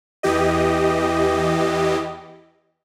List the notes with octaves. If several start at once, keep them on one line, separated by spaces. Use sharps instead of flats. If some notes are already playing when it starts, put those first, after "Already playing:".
E2 E3 G4 D#5